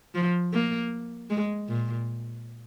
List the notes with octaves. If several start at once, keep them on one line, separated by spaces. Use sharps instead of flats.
F3
A#3
G#3
A#2